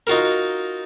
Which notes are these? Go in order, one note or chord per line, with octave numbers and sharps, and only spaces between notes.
D#4 F4 F#4 A#4